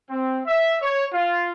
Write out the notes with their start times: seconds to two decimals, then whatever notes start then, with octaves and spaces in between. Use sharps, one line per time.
0.10 C4
0.46 E5
0.82 C#5
1.13 F4